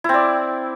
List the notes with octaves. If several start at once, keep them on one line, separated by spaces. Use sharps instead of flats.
C4 E4 D5